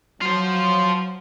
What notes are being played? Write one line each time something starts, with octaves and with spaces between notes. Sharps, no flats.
F#3 F4 C5